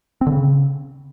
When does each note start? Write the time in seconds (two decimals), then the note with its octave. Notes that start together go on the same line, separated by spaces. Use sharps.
0.21 C4
0.27 D3
0.32 C#3